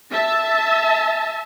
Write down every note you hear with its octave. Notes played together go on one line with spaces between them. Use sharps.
E5 A5